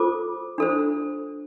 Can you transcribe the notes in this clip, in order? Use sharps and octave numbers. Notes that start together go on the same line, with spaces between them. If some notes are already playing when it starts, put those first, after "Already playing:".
Already playing: F4 A4 C5 D6
D4 A4 C5